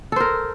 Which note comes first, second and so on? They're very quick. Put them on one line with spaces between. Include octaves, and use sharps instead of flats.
A4 C5 A#4